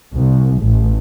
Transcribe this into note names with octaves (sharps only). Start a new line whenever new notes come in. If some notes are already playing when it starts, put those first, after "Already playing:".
C2
A1